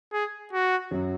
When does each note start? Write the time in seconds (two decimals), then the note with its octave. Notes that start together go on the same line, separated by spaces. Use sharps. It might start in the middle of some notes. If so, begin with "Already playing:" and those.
0.13 G#4
0.53 F#4
0.91 F#2 F#3